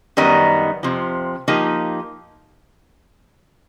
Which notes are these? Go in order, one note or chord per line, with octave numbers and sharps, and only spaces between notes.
F#2 D#3 G3 B3 D#4
F2 C3 F3
F3 A#3 D#4 G4